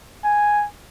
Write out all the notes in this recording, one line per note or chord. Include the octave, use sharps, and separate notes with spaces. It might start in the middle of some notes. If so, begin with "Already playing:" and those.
G#5